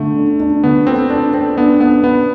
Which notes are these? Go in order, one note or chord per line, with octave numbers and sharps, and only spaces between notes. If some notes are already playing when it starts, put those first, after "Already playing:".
Already playing: D3 A3 A4
D4
D4
D3 B3
C4 A4
D4 A4
C4 A4
B3 D4
B3 D4
B3 D4